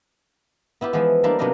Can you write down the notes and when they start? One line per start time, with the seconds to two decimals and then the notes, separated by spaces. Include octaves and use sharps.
0.81 B3 E4 F4 G4
0.93 E3 F3 G#3 B3
1.23 G3 A#3 D4 E4 F4
1.39 C3 F#3 B3 D4 D#4 A#4